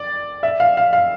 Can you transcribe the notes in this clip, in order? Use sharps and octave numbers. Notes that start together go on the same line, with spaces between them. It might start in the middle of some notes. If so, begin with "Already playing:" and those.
Already playing: D5
E5
F5
F5
F5